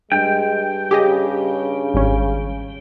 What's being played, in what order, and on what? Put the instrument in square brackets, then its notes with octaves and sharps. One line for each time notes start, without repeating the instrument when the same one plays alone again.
[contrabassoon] G2 [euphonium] G#3 [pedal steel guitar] G5
[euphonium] C#3 [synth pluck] G4 G#4 D#5
[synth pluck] G#1 G3 C#4